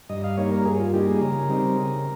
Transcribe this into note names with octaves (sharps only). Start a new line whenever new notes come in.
G2 D#5
F5
G3 A#3 D#4 C#5
A#4
G2 G#4
F4
G3 A#3 D#4 G4
G#4
C#3 A#4
G3 C4 D#4
C#3